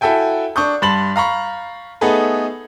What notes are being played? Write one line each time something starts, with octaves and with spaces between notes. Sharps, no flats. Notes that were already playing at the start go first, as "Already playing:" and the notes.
E4 F#4 A4 E5 G5 G#5
D4 C#6 D#6 G6
G2 A5 B5 C6 A6 F#7
F5 A#5 B5 C#6
A3 B3 D#4 G#4 A4 B4